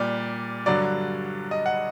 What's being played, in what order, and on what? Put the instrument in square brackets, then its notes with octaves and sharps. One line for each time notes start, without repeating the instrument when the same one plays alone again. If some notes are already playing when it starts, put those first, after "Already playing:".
Already playing: [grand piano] A#2 G3 D5
G2 D3 F#3 D5
D#5
F#5